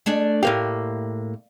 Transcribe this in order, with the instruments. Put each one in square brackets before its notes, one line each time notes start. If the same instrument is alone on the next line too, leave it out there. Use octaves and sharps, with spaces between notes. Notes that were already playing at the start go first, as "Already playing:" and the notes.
[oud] A3 D4 G#4
[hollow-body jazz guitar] A2 A#3 G4 [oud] F5